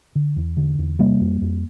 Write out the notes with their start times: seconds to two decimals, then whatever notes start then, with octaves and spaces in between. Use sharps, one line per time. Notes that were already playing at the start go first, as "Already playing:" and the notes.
0.15 D3
0.36 E2
0.57 D3
0.79 E2
0.99 C3 G3 A#3
1.21 F2
1.41 F2